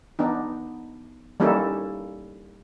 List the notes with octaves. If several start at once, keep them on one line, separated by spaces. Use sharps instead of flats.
B3 D4 D#4
G3 A#3 C#4 D#4 E4 A4